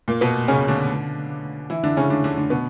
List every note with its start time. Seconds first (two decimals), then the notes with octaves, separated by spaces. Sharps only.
0.08 A#2 A#3
0.21 B2 B3
0.48 C#3 C#4
0.68 D3 D4
1.70 E3 E4
1.83 D3 D4
1.97 C#3 C#4
2.10 D3 D4
2.24 D3 D4
2.38 D3 D4
2.50 B2 B3